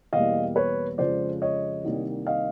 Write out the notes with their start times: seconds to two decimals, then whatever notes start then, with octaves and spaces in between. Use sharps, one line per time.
0.13 E2 B2 G3 A#3 D#5 F5
0.56 B4 C#5
0.98 F2 C#3 F3 G#3 C5 D5
1.42 C#5 D#5
1.85 C2 C3 D#3 G3 A#3
2.27 D#5 F5